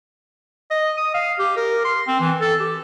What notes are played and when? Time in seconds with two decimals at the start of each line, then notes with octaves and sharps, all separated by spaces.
0.71 D#5
0.97 D#6
1.14 F5
1.39 G4
1.57 A#4
1.85 C6
2.07 C4
2.20 E3
2.41 A4
2.60 G4